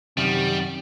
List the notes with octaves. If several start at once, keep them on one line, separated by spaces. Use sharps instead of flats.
F#2 C3 D#3 G3